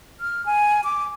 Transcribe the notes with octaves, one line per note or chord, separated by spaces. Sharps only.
F6
G#5
D6